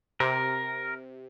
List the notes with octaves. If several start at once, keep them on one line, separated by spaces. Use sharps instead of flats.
C3 A#4